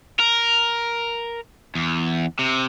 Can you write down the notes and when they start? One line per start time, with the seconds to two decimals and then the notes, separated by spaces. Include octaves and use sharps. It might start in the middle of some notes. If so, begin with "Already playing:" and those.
0.20 A#4
1.75 E2
2.39 C3